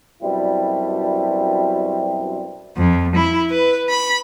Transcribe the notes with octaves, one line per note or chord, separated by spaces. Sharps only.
F#2 B2 G3 C4 D4 E4
F2
E4
B4
B5